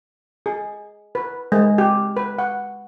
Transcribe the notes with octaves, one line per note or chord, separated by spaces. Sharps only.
G#4
B4
G#3
G4
B4
F#5